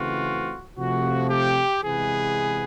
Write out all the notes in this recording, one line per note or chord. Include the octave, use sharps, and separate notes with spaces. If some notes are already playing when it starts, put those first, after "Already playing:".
Already playing: C#3 E3 A3 C4 F4 F#4
C3 F3 A3 F#4
G4
C3 E3 G#3 B3 G#4